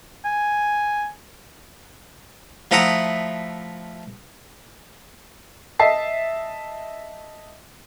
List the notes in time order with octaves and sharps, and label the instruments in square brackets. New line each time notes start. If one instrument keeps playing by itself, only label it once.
[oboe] G#5
[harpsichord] F3 A3 E4 F#5 A#5 D#6
[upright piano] D#5 E5 A5 C7